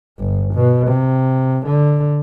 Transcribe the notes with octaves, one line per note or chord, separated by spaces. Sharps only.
G1
B2
C3
D3